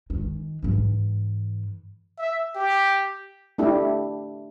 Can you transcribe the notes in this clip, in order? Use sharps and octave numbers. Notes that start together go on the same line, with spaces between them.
D#3 G#3
G#2 E3
E5
G4
A3 D4 E4 G4